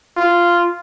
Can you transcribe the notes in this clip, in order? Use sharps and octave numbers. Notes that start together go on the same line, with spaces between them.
F4